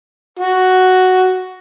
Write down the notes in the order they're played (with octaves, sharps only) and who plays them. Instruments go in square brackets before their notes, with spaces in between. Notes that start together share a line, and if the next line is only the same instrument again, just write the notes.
[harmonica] F#4